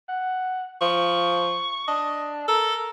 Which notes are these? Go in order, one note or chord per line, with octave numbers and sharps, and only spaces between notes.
F#5
F3 C#6
D4 D#5
A4 A#4